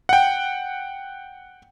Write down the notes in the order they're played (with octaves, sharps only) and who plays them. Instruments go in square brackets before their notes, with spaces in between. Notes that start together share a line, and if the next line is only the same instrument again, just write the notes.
[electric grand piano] F#5 G5